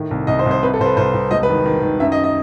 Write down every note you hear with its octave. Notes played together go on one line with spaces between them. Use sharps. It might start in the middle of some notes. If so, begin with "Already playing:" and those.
Already playing: A2 D#3
C2
C2 D#5
C5
C2
C5
C3 B4
A4
C2 C5
B4
C2 C5
C2
E1 D#5
B4
D#3
D#3
D#3
F#2 E5
D#5
D#5